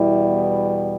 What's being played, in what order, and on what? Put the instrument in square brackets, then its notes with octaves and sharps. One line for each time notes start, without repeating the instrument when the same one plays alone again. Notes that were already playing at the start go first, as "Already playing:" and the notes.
Already playing: [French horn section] E2 B2 G3 E4